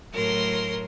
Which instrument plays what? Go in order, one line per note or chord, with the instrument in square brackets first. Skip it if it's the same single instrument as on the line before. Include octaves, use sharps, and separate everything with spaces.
[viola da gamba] A2 F#3 [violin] A#4 C6